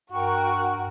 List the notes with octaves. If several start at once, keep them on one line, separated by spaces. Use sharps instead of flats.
G2 F#4 A#4 G5 C#6